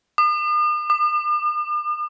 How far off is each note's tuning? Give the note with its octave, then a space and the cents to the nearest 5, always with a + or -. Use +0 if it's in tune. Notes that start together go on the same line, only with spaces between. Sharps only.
D#6 -45
D6 +45